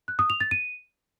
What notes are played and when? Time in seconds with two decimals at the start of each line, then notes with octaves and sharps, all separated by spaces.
0.08 F#6
0.19 D#6
0.30 F7
0.40 A6
0.51 D#7